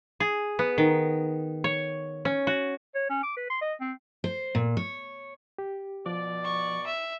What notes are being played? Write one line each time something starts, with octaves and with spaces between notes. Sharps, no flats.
G#4
B3
D#3
C#5
C#4
F#4
C#5
C#4
D6
B4
C6
D#5
C4
C5
A#2
C#5
G4
B2 F3 D5
C#6
E5